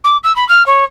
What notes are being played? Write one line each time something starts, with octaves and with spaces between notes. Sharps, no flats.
D6
E6
B5
F6
C#5